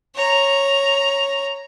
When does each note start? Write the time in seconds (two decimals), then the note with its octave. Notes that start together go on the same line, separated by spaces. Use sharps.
0.15 C#5 A#5